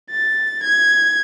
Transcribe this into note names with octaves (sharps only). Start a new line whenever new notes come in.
A6
G#6